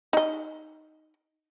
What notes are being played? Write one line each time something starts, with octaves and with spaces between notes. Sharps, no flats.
D#4 D#5